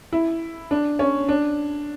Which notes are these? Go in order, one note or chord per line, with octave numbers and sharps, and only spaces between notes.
E4
D4
C#4
D4